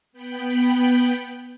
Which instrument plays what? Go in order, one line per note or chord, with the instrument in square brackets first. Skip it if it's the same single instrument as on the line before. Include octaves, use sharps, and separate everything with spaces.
[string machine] B3 G5 B5